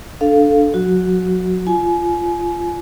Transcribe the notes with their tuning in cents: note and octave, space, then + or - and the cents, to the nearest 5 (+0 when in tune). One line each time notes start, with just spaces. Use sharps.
D4 -5 A4 -5 F5 +0
F#3 -30 F#4 +0
F4 -15 G#5 +30